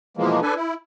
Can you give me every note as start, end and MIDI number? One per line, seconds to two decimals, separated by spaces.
0.17 0.40 47
0.17 0.40 52
0.17 0.40 53
0.17 0.40 56
0.17 0.40 58
0.42 0.54 62
0.42 0.54 69
0.42 0.54 71
0.42 0.54 80
0.56 0.74 64